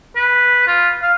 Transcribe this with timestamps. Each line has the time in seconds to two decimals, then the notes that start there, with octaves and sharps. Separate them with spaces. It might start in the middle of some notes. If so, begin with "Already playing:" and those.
0.16 B4
0.68 F4
1.02 F5